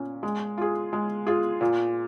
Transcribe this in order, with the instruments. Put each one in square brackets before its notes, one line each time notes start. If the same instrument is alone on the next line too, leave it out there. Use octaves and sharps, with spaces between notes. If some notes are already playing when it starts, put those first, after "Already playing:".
Already playing: [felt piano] A#2 C#4
G#3
F4 G#4
G#3
F4 G#4
A#2